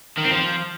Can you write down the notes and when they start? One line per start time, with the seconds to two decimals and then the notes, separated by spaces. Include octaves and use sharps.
0.17 D#3
0.24 C4
0.31 F3